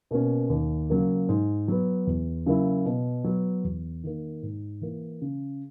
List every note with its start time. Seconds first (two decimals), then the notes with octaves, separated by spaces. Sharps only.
0.11 B2 A#3 C#4
0.49 D#2
0.90 C#3 F#3 A#3
1.29 G#2
1.68 F#3 B3
2.07 E2
2.46 C#3 F#3 A#3 E4
2.86 B2
3.24 F#3 B3
3.64 E2
4.04 D#3 A#3
4.43 G#2
4.81 E3 A#3
5.21 C#3